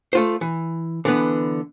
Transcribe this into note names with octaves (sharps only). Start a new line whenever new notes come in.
A3 F4 C5
E3
D3 E3 B3